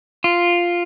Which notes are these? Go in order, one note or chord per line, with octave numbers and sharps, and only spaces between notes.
F4